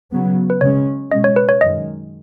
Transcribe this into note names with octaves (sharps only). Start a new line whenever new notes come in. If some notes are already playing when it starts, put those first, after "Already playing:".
C#3 F#3 B3
B4
C#3 G#3 C#4 C#5
B2 G#3 C#4 D#5
C#5
B4
C#5
F#2 D#3 G#3 D#5